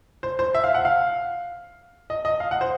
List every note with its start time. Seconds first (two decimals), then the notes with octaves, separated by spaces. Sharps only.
0.23 C5
0.39 C5
0.54 E5
0.64 F5
0.74 F#5
0.85 F5
2.10 D#5
2.25 D#5
2.40 F5
2.51 F#5
2.61 C5